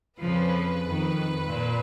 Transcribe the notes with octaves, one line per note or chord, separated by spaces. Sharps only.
F2 C#3 F3 B4
F2 D#3
A#2